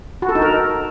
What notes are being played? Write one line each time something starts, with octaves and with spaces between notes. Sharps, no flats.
F#4
A4
D#4
A#4